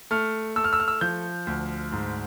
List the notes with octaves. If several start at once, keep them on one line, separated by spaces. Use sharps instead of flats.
A3 F6
A3 E6
F6
E6
F6
E6
F3 G6
D2
G#2